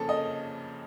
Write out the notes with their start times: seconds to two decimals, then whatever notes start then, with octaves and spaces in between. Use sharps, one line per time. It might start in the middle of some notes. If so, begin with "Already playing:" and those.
Already playing: F2 C#3 F3 A#3 C#4 A4
0.09 D#5